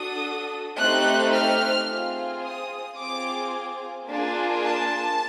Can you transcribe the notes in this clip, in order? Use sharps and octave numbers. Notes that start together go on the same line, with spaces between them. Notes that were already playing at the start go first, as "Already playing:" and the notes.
Already playing: D4 F#4 A4 D#6
A3 C4 D#4 G4 F#6
F6
C4 F4 G#4
D#6
C4 F4 G#4 D6
A#3 D4 F4 G#4
A5